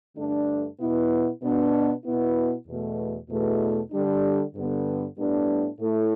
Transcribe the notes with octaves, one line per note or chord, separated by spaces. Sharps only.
G2 D3 A3 D4
B2 B3 E4
B2 B3 D4
B2 B3 E4
E2 B2 A3
E2 B2 A3
D3 G3 D4
G2 D3 B3
A2 G3 B3 D4
A2 A3 E4